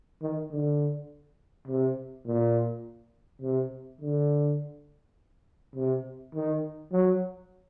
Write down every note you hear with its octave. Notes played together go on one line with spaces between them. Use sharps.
D#3
D3
C3
A#2
C3
D3
C3
D#3
F#3